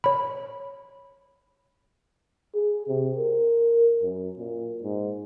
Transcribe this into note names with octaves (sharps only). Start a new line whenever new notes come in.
C#5 B5
G#4
C3
A#4
F#2
A#2
G#2